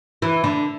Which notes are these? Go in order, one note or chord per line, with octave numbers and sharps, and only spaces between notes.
E3
D3